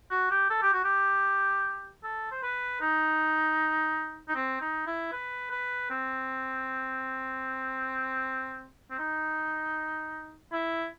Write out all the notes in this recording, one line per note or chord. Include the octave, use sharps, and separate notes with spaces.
F#4
G4
A4
G4
F#4
G4
A4
C5
B4
D#4
D#4
C4
D#4
E4
B4
B4
C4
C4
D#4
E4